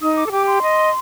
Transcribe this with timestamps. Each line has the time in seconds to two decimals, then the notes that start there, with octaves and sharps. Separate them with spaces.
0.01 D#4 D#6
0.16 D6
0.26 A4
0.32 G4 D6
0.46 C6
0.62 D#5